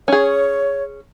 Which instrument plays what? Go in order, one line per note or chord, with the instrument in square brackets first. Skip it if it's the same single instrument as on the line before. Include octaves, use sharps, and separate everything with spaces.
[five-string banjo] C#4 G#4 [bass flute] C#5